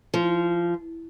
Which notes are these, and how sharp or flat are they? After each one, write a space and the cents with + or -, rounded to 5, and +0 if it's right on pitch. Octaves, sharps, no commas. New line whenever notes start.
F3 -20